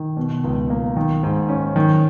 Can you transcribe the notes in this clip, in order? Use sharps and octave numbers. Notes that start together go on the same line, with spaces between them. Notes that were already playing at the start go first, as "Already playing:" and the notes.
Already playing: D#3
B2
C#2
A#3
D#3
G#2
C#4
D#3